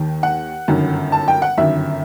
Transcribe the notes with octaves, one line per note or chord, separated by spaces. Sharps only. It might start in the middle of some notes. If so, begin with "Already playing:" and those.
Already playing: D#2 D#3
F#5
G1 F#2 D#3
A5
G5
F#5
G1 F#2 D#3 E5